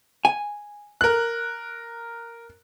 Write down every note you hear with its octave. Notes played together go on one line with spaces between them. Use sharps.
G#5
A#4 F#6